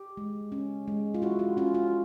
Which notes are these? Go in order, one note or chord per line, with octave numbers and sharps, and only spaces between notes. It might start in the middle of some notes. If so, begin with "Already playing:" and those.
Already playing: G4
G#3
C#4
G#3
F4
E4 F#4
F4
C#4 F4
F4